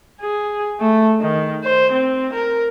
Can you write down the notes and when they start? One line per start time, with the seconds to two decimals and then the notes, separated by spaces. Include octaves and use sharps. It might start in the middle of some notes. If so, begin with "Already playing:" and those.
0.21 G#4
0.80 A3
1.21 D#3
1.64 C5
1.92 C4
2.33 A#4